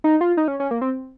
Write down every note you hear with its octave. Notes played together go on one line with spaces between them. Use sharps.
D#4
F4
D#4
C#4
C#4
A#3
C4